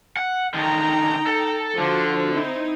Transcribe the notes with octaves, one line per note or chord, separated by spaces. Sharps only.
F#5
D3 D#3 D#4 G5 A#5
A4
D3 F3 F4 F#4
C4 D#4 E4